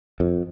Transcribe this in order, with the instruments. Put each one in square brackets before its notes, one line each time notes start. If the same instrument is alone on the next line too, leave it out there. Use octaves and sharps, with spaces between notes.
[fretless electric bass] F2